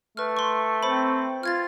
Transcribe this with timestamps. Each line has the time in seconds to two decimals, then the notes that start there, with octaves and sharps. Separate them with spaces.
0.17 A3 B4 F6
0.37 C6 C#6
0.83 C4 C5 B5
1.43 F4 F6 G#6 A6